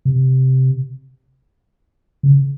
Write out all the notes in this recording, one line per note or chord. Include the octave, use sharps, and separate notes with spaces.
C3
C#3